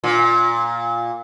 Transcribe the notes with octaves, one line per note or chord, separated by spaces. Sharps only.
A#2